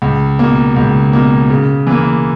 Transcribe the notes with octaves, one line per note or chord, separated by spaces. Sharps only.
C#2
B2 A#3
C#2
B2 A#3
C#3
E3 A#3